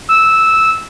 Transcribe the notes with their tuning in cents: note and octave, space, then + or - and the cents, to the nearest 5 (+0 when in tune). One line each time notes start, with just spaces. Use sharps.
E6 -10